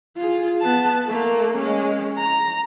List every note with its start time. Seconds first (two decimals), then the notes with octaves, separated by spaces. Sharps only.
0.17 F4 G#4
0.61 B3 A5
1.05 A3 A#3
1.56 G#3 C#4
2.16 A#5